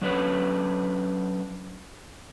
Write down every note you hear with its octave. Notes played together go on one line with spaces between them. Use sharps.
F#3 C#4 D4 A4 B4 C#5